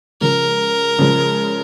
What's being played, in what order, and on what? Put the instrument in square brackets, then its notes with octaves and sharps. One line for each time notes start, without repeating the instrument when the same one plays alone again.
[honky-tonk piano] C#3 F3 G#3 [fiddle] A#4
[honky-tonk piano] C#3 F3 G#3